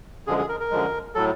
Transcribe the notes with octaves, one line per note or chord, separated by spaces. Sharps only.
F#2 D3 F3 G#3 G#4
G#4
A#4
A#4
F#2 D3 F3 G#3
A2 F#3 A4